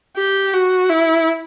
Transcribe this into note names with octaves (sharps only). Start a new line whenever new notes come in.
G4
F#4
E4